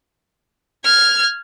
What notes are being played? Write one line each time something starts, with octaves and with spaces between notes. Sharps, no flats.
F6 G#6